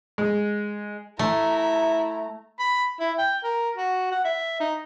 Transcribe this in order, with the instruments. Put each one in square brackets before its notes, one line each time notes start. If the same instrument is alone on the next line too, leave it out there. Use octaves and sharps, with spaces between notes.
[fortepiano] G#3
[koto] A3 [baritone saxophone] E4 [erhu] A#5
[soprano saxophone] B5
E4
G5
A#4
F#4
F#5
E5
D#4